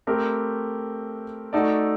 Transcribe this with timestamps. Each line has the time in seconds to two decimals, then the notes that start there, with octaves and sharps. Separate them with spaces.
0.07 A3 C4 G4 A#4
1.53 A3 D#4 F#4 A4 D5